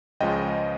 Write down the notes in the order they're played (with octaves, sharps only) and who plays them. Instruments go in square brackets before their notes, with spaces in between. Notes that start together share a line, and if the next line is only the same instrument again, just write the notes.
[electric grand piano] C#2 C#3 F3 G#3 D#5 G5